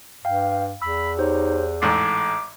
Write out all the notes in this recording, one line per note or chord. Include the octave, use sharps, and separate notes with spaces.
G2 F5 G5
E2 B5 E6
D#4 G4 C5 C#5
A1 G#2 A3 D6 C7